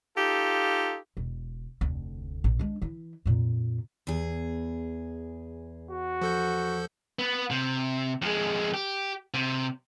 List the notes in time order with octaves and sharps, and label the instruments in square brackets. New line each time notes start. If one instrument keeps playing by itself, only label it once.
[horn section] D#4 F4 G4 A4
[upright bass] E1
F1 D2
A#1
G#3 D4
E3 E4
F2 A#2
[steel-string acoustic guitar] E2 G#4
[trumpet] F#4
[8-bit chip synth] F3 A4 G6
[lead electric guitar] B3
C3
F2 G#3
G4
C3